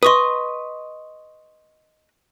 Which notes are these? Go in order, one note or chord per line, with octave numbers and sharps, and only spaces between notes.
B4 D#5 C6 C#6 D#6